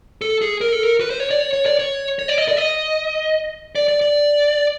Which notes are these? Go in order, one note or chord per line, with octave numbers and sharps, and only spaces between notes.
A4
G#4
A#4
A4
A#4
B4
C5
C#5
D5
C#5
C#5
D5
C#5
C#5
D5
D#5
D5
D#5
D5
D5
D5